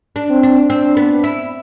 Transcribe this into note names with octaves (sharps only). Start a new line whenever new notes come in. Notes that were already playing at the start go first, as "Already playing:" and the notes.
D4
C4
D4
C4 D4
B3
E4